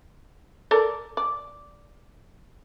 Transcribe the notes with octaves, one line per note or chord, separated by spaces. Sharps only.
A4 A#4 D5
D5